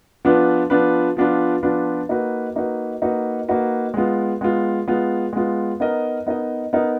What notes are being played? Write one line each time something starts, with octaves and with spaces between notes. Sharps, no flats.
F3 B3 D4 F4 B4
F3 B3 D4 F4 B4
F3 B3 D4 F4 B4
F3 B3 D4 F4 B4
A#3 D#4 F#4 B4
A#3 D#4 F#4 B4
A#3 D#4 F#4 B4
A#3 D#4 F#4 B4
G#3 B3 F4
G#3 B3 F4
G#3 B3 F4
G#3 B3 F4
B3 D#4 A#4 D#5
B3 D#4 A#4 D#5
B3 D#4 A#4 D#5